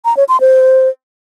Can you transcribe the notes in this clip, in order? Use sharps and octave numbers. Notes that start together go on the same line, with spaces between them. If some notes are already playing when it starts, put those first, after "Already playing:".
A#5
C#5
C6
C5